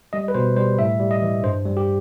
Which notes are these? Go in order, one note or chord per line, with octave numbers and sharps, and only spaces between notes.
G3 D#5
B4
B2 C5
G3 C5
A2 E5
G3
D#5
E3
G2 C5
G3
G4